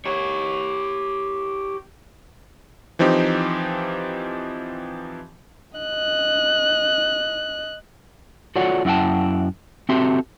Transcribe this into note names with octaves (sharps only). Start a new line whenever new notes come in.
G4 C#5
E3 F3 C4 D#4 G4
D#5 F#6
F4 F#4 A4 C#5 D5 F#5
F#2 E4 F#5 G5 A5
C4 F#4 G4 A4 E5 C6